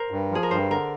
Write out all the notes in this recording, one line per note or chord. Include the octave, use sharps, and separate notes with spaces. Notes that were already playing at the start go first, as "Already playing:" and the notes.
Already playing: A#4 C5
G2
F3 G#4
A#4
G2 C5
D3 A#4